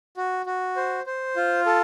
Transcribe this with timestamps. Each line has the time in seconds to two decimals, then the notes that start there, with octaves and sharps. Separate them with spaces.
0.17 F#4
0.46 F#4
0.76 C5
1.06 C5
1.36 F4
1.66 A4